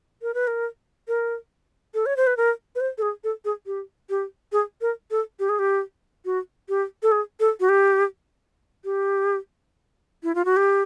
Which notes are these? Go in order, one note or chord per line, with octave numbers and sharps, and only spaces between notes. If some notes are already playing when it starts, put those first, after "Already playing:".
A#4
B4
A#4
A#4
A4
C#5
C5
B4
A#4
B4
C5
A4
G#4
A4
G#4
G4
G4
G#4
A#4
A4
G4
G#4
G4
F#4
G4
A4
G#4
A4
F#4
G4
G4
E4
F4
F#4
G4